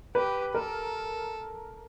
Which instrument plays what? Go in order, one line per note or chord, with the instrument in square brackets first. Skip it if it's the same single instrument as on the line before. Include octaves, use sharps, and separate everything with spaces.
[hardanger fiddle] G4 [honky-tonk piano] B4
[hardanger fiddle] A4 [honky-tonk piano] A#4